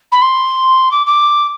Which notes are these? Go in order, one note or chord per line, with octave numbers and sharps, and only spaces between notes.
B5
C6
D6
D6